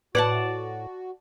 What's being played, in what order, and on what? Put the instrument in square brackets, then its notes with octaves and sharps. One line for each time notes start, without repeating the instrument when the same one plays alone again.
[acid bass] A2 [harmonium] F#4 [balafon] B4 [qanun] D5 F#5 A5